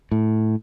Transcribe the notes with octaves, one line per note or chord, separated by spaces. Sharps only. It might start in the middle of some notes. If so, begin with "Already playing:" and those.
A2